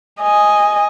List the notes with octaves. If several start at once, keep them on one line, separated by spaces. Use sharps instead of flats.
D#5 G#5